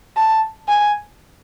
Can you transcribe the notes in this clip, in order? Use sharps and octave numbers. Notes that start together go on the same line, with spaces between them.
A5
G#5